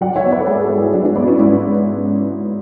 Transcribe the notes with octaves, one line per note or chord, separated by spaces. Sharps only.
F#3 D5 F#5
C#5 E5
B3
B4 D5
A4
G#2 G#4 B4
F#4 A4
G#2
E4 G#4
F#3 D4 F#4
D4 F#4
B3 B4 D5
C#4 E4
G#2 C#4 E4